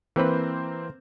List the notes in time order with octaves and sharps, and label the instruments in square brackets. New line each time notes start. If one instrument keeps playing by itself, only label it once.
[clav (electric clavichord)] E3 B4 [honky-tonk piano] A#3 C4 C5